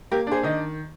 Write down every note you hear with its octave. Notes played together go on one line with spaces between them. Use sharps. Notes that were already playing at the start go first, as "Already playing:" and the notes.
A#3 G4 A#4
D4 G#4 C5
D#3 D#5